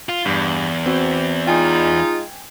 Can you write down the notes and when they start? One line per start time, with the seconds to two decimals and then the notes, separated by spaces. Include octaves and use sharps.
0.09 F4
0.26 E2 G2
0.86 C4 F#4 C5
1.47 G#3 D#4 F4 G5 G#5